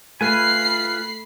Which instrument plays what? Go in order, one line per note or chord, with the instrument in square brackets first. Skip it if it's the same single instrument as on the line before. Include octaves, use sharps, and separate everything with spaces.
[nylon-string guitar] A3 [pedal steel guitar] F4 B4 G#5 [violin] B5 C7